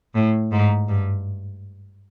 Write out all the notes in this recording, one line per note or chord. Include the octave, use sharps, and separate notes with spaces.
A2
G#2
G2